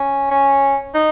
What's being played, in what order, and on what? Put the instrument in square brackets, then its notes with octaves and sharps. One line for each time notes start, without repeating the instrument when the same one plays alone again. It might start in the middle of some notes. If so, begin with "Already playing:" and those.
Already playing: [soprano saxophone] C#4
C#4
D#4